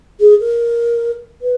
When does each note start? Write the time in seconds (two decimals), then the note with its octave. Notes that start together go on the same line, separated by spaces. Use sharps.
0.19 G#4
0.40 A#4
1.41 B4